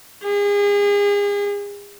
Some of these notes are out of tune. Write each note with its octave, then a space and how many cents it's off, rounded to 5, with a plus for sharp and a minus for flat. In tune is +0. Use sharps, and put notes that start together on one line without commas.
G#4 -35